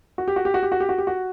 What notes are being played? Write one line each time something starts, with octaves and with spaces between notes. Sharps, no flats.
F#4
G4
F#4
G4
F#4
G4
F#4
G4
F#4
G4
F#4